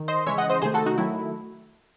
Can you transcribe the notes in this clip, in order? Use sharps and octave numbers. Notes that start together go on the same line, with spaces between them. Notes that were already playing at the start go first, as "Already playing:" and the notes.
Already playing: D#3
C5 D#5
C#3 E3 G#3 C#5 E5
D#5 F#5
C5 D#5
C3 D#3 A3 G#4 C5
F#4 A4
D#4 F#4
D#3 F#3 A3 E4